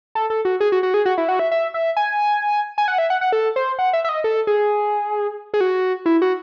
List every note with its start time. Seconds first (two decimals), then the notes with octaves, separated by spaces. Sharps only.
0.15 A4
0.30 A4
0.45 F#4
0.60 G#4
0.72 F#4
0.83 F#4
0.94 G#4
1.06 F#4
1.18 E4
1.29 F#4
1.39 E5
1.51 E5
1.74 E5
1.97 G#5
2.78 G#5
2.88 F#5
2.98 E5
3.10 F#5
3.21 F#5
3.32 A4
3.56 C5
3.79 F#5
3.93 E5
4.05 E5
4.09 D#5
4.24 A4
4.47 G#4
5.54 G#4
5.61 F#4
6.06 E4
6.22 F#4